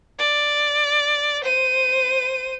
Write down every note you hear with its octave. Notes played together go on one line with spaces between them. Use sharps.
D5
C5 D#7